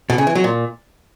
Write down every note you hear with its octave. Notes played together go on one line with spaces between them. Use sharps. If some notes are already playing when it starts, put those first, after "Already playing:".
B2
C#3
E3
F#3
A#2